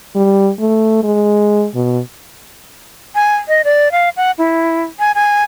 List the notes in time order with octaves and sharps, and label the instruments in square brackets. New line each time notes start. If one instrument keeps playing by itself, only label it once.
[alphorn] G3
A3
G#3
B2
[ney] G#5
D#5
D5
F5
F#5
E4
G#5
G#5